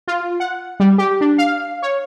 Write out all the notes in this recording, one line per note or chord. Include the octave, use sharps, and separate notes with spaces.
F4
F#5
G3
G4
D4
F5
C#5